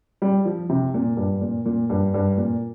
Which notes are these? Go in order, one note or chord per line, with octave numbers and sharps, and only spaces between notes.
G3
F3
C3
A#2
G2
A#2
A#2
G2
G2
A#2